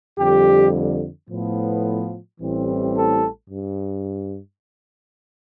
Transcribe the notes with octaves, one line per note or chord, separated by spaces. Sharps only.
F2 D3 G3 G4
A2 F3 B3
A1 A2 E3 G3 C4
A4
G2